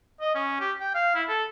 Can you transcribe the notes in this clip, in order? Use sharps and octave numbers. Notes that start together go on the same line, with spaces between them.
D#5
C#4
G4
G5
F5
E4
A4